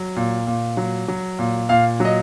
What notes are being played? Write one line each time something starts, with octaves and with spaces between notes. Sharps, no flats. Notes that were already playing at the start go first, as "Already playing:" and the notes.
Already playing: F#3
A#2
A#2
F#3
F#3
A#2
A#2 F5
F#3 D#5